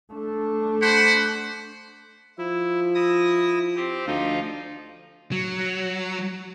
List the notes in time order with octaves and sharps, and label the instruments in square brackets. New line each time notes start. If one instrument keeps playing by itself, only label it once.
[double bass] A3 D4
[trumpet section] C5 F#5 B5
[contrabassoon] F3 [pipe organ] E4
[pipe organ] E4 D#6 A#6
C4 G4
[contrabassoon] D2 [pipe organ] F3 D#4 F4
[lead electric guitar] F#3